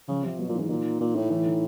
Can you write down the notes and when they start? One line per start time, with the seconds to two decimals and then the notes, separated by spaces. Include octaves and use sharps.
0.08 C#3 F3
0.23 C3 F3
0.39 B2 F#3
0.49 A#2
0.54 E3
0.60 G#2
0.69 A#2 D#3
1.01 A#2
1.16 A2
1.30 A2 E3
1.46 D#3